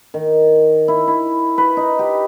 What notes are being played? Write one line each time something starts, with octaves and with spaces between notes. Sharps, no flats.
D#3
E4
E4
B4
D#4
G4